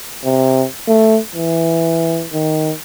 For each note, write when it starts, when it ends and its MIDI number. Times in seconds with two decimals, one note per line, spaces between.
0.25 0.65 48
0.88 1.19 57
1.35 2.26 52
2.33 2.72 51